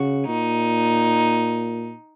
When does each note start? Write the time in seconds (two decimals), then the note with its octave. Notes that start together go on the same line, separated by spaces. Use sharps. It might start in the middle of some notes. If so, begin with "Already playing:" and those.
Already playing: C#3 F#4
0.27 A#2 D#4